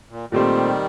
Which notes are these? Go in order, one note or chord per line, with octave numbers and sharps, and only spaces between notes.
A#2
A#2 D#3 G3 A3 C4 G4 C5